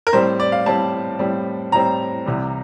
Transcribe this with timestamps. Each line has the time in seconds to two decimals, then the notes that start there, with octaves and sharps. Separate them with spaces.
0.07 A#4
0.13 A2 G3 C4 C5
0.40 D5
0.52 F5
0.66 A2 G3 C4 A5
1.19 A2 G3 C4
1.72 A2 G3 C4 A#5
2.26 C2 C3 E3 G3